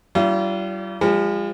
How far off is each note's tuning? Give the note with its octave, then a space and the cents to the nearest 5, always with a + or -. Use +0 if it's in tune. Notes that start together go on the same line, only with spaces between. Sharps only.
G3 -35 D4 +0 F4 -40
F3 +0 G#3 -45